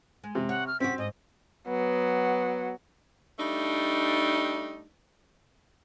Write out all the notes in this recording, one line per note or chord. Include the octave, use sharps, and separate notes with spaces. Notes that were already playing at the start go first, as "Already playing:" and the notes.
G#3
C3
C#5 F#5
F6
F#2 C3 C4 F#4 B6
G#2 D#5
F#3 B3
G3 A3 D4 D#4